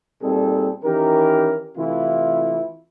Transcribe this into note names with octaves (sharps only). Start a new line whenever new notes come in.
A#2 G3 C4 D#4 G#4 A4
D#3 E3 C#4 G4 A#4
C3 E3 A3 E4 F4